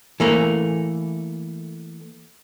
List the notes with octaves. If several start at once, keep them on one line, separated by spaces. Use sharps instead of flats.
E3 A3 A#3